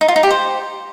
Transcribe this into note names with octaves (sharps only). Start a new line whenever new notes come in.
D#4
F4
D#4
G4
C5